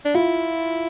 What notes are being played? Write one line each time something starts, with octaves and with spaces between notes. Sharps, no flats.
D4
E4 F4